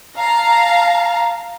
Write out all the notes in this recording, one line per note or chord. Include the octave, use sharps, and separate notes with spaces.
F5 A5 A#5